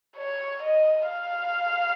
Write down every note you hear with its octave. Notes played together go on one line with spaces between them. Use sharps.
C#5
D#5
F5